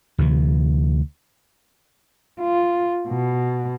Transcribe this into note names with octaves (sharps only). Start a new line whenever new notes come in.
D2 C3 E3
F4
B2